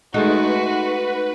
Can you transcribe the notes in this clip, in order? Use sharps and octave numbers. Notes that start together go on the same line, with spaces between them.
G#3 A3 D#4 F#4 B4 F#5